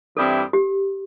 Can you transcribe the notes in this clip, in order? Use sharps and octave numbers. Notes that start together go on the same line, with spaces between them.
G2 E3 G3 C4 E4 A4
G4